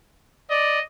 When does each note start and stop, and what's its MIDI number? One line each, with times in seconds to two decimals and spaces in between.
0.50 0.79 74
0.50 0.82 75